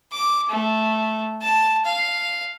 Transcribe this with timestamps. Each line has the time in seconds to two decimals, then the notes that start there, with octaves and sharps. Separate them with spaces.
0.12 D6
0.49 A3
1.41 A5
1.85 F5